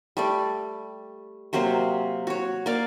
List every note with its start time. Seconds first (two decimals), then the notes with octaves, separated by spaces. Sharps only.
0.17 G3 A3 D5
1.53 C3 F#3 A#3 C5
2.27 F#4 C#5
2.66 A#3 D5 F5